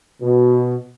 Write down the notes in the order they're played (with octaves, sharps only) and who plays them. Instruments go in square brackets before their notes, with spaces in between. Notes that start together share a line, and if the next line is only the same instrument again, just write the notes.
[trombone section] B2